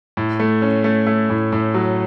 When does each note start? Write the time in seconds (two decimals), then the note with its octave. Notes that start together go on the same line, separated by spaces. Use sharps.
0.17 A2
0.40 A3
0.62 C#4
0.84 A3
1.07 A3
1.30 A2
1.52 A2
1.74 F#3